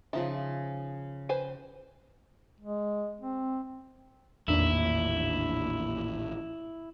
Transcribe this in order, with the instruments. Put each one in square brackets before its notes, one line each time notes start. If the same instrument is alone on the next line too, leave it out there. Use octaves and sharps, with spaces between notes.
[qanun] C#3 F3 A5 [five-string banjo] D#4 E5
[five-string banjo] B4 C5 G#5
[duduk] G#3
C4
[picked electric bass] A1 A#2 D#3 [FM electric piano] E2 A#3 D4 [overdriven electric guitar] E4